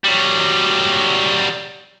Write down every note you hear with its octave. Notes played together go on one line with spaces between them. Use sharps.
F#3 G3